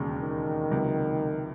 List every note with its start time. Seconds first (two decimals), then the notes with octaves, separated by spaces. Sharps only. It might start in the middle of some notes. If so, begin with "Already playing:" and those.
Already playing: E1 D#2 C#3
0.21 D#3
0.70 C#2 C3 F#3